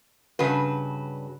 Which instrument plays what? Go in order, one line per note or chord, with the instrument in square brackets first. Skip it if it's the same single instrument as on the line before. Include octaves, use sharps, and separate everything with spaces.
[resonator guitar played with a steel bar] G2 C#3 F#4 B4